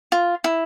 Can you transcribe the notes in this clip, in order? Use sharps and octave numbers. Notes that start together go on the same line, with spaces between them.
F4
E4